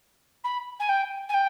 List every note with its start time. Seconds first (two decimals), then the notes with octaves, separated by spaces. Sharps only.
0.44 B5
0.79 G#5
0.89 G5
1.29 G#5
1.34 G5